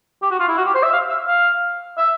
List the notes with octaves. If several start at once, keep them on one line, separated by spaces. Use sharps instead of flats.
G4
F#4
F4
E4
F#4
G4
C5
E5
F5
E5
F5
E5